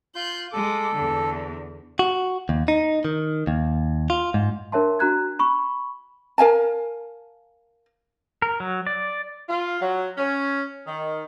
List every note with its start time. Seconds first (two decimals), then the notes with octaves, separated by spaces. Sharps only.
0.15 F4 C6 F#6 G6
0.53 G#3 A4 D6
0.95 E2 D3
1.99 F#4
2.49 D#2
2.68 D#4
3.05 D#3
3.47 D#2
4.10 F4
4.34 G#2
4.72 D4 A#4 C#5 E5 A5 C6
4.99 D4 F#4 A#5 F#6 G#6
5.39 B5 C#6
6.38 A#4 F5 G#5 A5
8.42 A#4
8.60 F#3
8.87 D5
9.48 F4
9.81 F#3
10.18 C#4
10.86 D#3